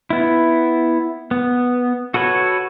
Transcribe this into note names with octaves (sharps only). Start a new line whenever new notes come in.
B3 E4
B3
F#4 A4 B4 C#5